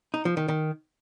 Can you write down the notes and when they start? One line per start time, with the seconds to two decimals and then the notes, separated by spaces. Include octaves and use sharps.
0.14 D#4
0.25 F3
0.37 D#3
0.48 D#3